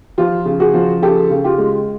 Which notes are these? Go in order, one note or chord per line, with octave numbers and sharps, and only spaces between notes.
F3 F4 G4
C#3
F#4 G#4
F3
C#3 G4 A4
C#3
F4 G4
G#3